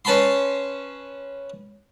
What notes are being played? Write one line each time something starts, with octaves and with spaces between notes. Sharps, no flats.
C#4 B4 A5 B5 C6